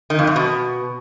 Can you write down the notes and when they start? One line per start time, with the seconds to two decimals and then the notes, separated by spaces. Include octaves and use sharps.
0.10 D#3
0.19 F2
0.27 F#2
0.36 B2